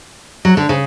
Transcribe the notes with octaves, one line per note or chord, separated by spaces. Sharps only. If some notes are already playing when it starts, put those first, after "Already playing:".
F#3
D3
C#3